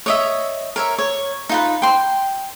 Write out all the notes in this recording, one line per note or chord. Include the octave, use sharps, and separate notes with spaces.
C#5 D#5 E5
A#4 C#5 E5
C#5
D#4 F4 B4
G5 C6